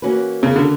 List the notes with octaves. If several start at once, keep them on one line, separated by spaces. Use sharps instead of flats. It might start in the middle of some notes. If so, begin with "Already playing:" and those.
E3 A#3 C#4 F#4 B4
C#3
D3